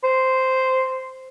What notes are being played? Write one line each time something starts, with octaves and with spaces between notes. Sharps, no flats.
C5